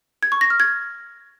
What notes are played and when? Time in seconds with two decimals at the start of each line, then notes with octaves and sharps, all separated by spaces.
0.23 G#6
0.32 C#6
0.41 A#6
0.50 F6
0.60 G#6